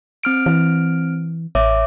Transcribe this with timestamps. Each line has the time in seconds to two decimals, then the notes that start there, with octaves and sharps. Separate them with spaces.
0.23 C4 F6 D7
0.46 E3
1.55 A1 C#5 E5 D6